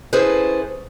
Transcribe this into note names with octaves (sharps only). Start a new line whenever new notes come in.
C#4 E4 G#4 A4 B4 C5